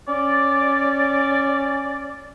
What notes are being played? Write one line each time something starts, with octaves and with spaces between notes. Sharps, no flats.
C#4 D5